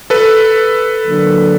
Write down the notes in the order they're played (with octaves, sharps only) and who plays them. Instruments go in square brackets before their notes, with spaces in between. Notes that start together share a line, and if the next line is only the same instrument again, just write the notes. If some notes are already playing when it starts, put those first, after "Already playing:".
[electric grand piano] A4 B4
[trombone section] D3 F#3 A#3 D4